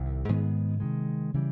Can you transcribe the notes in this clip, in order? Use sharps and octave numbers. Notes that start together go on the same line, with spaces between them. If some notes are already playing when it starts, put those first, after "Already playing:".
Already playing: C2 C3 D#3
G#2 D#3 G#3 B3
C3 D#3 G#3
C#3 E3 G3